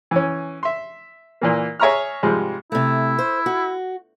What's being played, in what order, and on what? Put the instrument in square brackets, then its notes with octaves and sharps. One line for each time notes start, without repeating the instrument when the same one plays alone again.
[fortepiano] E3 C#4
E5 C6
A#2 E3 A#3
G#4 C#5 E5 A#5 C#6 F6
G#2 C3 F3 G3 G#3
[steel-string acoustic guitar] C3 A3 [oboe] E4
[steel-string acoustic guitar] C5
F#4